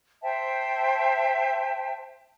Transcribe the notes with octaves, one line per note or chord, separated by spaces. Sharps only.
C5 E5 G5 A5